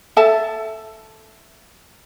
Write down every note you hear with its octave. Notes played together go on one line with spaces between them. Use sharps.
A4 E5 A5